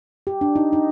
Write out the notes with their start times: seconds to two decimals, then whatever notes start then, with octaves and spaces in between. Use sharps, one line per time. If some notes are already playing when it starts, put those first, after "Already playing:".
0.27 G4
0.41 D4
0.56 D#4
0.73 D#4